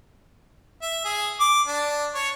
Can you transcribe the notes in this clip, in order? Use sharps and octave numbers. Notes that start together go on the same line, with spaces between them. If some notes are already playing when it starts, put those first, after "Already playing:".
E5
G#4
D6
D4
C#5